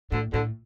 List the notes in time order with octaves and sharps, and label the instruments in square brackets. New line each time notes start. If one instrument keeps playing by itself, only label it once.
[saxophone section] D2 D3 [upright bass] A2
[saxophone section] D2 D3 [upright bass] A2